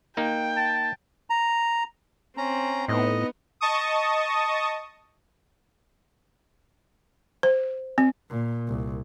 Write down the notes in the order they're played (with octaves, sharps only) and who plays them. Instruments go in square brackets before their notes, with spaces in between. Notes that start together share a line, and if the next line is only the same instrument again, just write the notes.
[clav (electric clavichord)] A#3 D#4 [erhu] G5
[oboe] A5
[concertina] A#5
[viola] C4 [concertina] C#4 A#5
[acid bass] A2 [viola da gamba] B3 D#4 [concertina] D#5
[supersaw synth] D#5 A5 C#6 D#6
[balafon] C5
C4
[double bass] A#2
C2